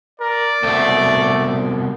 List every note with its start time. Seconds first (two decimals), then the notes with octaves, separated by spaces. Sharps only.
0.20 A#4 D5
0.63 C2 B2 A3